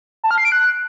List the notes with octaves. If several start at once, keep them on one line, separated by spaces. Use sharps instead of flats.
A5
F6
C7
D7
F#6